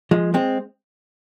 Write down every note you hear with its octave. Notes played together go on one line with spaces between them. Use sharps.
F3 G#3
G#3 C4